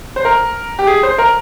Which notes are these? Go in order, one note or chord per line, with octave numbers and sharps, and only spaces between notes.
C5
A#4
G4
G#4
C5
A#4